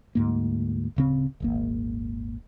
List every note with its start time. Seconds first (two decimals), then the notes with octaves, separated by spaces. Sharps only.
0.15 D2 G#2 A#3
0.96 D1 C#3 C4
1.40 D#1 G#1 A#3